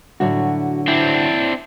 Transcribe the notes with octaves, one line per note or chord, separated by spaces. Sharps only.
A2 D3 F#3 F#4
C4 D4 E4